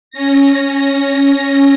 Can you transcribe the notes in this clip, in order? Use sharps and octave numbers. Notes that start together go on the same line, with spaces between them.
C#4 A#6